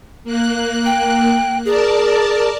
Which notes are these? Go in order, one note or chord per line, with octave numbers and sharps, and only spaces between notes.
A#3 F#6
G5
G#4 A#4 D5 A5